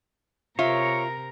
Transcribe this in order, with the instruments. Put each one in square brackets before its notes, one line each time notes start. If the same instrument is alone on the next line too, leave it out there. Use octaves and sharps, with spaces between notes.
[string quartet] C3 A#4 A#5 [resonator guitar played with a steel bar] F4 E5 [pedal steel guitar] C#5